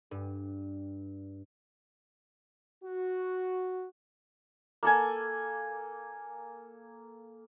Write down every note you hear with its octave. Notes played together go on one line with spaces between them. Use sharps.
G2
F#4
A#3 A4 G#5